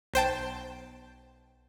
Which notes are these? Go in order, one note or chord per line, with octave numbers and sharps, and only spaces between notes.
B1 C5 G5 A5